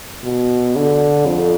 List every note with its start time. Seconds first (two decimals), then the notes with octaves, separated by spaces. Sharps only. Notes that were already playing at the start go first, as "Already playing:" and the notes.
0.24 B2
0.76 D3
1.26 F2